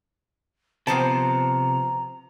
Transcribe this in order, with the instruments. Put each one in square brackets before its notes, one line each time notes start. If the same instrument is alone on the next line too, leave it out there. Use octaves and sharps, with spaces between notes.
[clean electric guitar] C3 [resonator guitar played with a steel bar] F3 B3 C5 [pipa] C4 A5 [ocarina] A#5